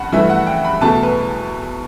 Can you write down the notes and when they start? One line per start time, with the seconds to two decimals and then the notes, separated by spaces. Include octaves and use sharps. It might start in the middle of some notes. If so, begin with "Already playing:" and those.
Already playing: G2 F#5 B5
0.12 G2 E3 A3 E5
0.29 F#5
0.47 G5
0.64 B5
0.81 E2 B2 A3 A5
1.03 B4